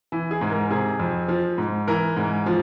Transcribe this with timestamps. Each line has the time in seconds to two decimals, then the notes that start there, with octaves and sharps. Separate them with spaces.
0.12 E3
0.31 G#4
0.41 G#2
0.51 A#4
0.70 C3 G#4
0.99 F2
1.28 F3
1.58 G#2
1.88 E3 A#4
2.16 G#2
2.46 F3